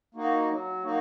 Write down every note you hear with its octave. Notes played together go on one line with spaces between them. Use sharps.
A#3 D#4 F#4
F#3
A#3 D#4 F#4